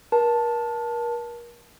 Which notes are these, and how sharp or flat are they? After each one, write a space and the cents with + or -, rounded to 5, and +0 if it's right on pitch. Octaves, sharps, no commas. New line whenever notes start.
A#4 +35 A5 +0